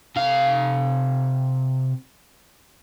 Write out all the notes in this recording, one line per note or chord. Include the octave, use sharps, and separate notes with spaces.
C3 F5